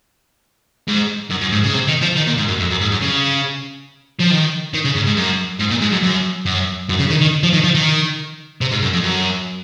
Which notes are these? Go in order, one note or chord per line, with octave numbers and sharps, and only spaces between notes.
G#2
F#2
F#2
G#2
C#3
C3
D#3
F3
D#3
A#2
G#2
F#2
F2
F#2
G#2
F#2
C#3
F3
D#3
D#3
C#3
G#2
G#2
F#2
G#2
A#2
G#2
F#2
F#2
F#2
F#2
C#3
D#3
D#3
F3
D#3
F3
D#3
C3
G#2
F#2
F2
F#2